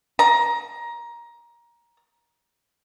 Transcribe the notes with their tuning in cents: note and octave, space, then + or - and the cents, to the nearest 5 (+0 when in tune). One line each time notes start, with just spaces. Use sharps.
A#5 +20